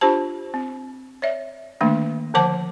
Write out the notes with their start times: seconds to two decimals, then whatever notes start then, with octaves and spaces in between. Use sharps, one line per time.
0.01 D4 F4 G4 C5 A5
0.54 C4
1.22 C#5 D5 E5
1.81 D3 D#3 A3 A#3 D4
2.34 D3 F3 C5 F#5 A5 D6